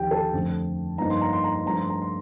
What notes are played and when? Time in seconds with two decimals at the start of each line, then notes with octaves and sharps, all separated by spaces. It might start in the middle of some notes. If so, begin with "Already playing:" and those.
Already playing: D#2 D3 F3 G4 G5
0.11 A4 A5
0.33 F2 D3 A3
0.98 G2 F3 A#3 D#4 A#5
1.10 C6
1.21 A#5
1.33 C6
1.44 A#5
1.55 C6
1.64 G2 F3 A3 D4 A#5
1.79 C6
1.90 A#5
2.02 C6